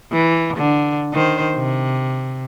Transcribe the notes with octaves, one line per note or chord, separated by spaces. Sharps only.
E3
D3
D#3 C5
C3